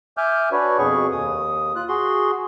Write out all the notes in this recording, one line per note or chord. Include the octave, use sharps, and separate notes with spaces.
E5 G#5 D6 F6 G6
D4 F#4 B4 C#5
F2 B2 G#4 C#6
D#2 D#6
F4 F#6
F#4 G#4 C6